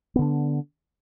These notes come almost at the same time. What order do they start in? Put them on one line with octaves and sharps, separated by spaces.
B3 D3 D4